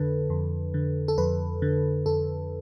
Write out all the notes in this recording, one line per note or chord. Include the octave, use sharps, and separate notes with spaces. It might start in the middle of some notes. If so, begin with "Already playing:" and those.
Already playing: F2 D3 A4 B4
F2
D3
A4
F2 B4
D3
F2 A4